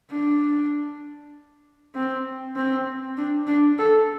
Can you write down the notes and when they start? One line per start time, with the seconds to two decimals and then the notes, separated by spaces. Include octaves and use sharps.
0.11 D4
1.95 C4
2.56 C4
3.17 D4
3.47 D4
3.78 A4